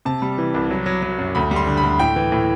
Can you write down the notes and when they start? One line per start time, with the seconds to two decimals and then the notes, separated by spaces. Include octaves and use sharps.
0.05 C3 A5
0.22 G3
0.38 E3
0.54 C2
0.70 F#3
0.86 F#3
1.02 F#3
1.19 F#2
1.35 D2 B5
1.51 G3
1.56 C6
1.67 D3
1.77 B5
1.83 D2
2.00 A2 G5
2.16 E3
2.32 A2